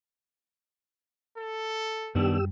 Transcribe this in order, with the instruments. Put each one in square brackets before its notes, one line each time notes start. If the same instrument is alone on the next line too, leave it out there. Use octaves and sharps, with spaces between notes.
[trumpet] A4
[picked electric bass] F#2 G3 [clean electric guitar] D#3 B3 D4 [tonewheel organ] G4 E6